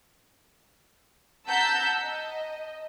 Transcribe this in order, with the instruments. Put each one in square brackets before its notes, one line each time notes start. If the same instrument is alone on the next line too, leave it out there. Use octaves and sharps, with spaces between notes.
[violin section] F#5 A5 A#5 E6 G6 B6
D#5